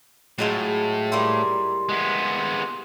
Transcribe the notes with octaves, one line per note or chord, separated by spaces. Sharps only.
A2 F#3 G#3 F4
G3 A#3 E4 C6
G#3 B3